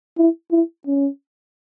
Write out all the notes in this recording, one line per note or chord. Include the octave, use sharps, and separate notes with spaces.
E4
E4
C#4